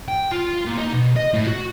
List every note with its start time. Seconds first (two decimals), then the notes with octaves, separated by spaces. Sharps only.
0.08 G5
0.32 F4
0.65 A#2
0.77 D#4
0.93 B2
1.16 D#5
1.34 A2
1.47 F#4